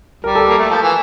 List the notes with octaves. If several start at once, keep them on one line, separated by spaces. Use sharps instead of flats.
G3 A#4
A4
A#3
A3
F3
E3